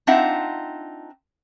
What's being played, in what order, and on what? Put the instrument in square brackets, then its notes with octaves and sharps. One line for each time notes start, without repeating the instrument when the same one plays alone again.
[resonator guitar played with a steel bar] C4 D4 D#4 F4 E5 F#5